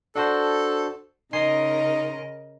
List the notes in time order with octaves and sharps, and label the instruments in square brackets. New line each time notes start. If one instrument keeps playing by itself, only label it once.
[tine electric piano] D4 F#4 C5 [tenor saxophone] A4
[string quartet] C#3 A#4 D#5 [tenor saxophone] D#4 [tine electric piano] G#5 C6 C7